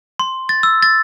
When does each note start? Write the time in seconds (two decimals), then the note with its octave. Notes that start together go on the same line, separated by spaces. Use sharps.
0.19 C6
0.49 A6
0.63 E6
0.82 A6